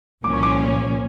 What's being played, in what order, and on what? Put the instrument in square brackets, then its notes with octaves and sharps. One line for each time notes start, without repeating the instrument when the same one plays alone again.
[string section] C2 A#2 F3 A#3 C#4 [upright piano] D6
[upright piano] C#6
D6